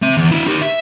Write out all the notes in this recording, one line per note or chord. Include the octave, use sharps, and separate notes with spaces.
C4 E5
E2
D4 E4
D#4 G4
E5